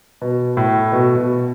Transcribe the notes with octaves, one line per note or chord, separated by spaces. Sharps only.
B2
A2
B2
B2